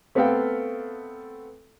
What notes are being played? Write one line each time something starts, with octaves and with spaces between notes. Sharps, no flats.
A3 B3 C4 A4 F5 G5